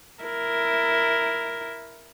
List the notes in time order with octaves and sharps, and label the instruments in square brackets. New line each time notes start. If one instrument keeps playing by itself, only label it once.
[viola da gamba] E4 A#4